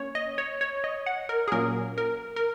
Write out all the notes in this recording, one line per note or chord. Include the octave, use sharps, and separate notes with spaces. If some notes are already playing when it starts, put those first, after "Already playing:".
Already playing: A#3 C#4 C#5
D#5
C#5
C#5
D#5
F#5
A#4
G#4
A#2 F#3 A#3 C#4 A#4
A#4
A#4